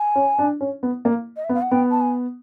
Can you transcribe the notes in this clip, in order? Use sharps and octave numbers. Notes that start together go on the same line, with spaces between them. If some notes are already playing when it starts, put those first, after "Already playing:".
Already playing: G#5
C#4
D4
C#4
B3
A#3
D#5
E5
B3
F5
F#5
B3 G5
A5
G#5